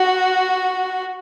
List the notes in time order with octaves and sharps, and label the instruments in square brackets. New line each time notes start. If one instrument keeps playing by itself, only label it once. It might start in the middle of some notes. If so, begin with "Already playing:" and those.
Already playing: [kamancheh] F#4